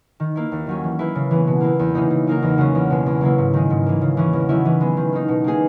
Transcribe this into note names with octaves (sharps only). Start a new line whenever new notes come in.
D#3
A#3 E4
D#2
D#3 F#3 C#4
E3
A#3 E4 B4
C#3
E3 G#3 B3
B2
A#3 E4 B4
E2
C#3 E3 G#3 D#4
C#3
F#3 A#3 D#4 A#4
E2
C#3 G#3 C#4 F#4
E2
B2 G#3
E2
C#3 F#3 A#3 E4
G#2
D#3 G#3
G#2
E3 A#3
C#3
E3 G#3 C#4
E2
D#3 F#3 C#4 E4
E3
G#3 B3
D#3
A#3 D#4
B2
A#3 D#4 G#4